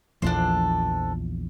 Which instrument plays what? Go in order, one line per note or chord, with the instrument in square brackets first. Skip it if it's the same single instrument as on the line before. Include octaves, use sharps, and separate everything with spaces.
[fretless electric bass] A#1 E2 F3 [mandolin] D4 A4 C5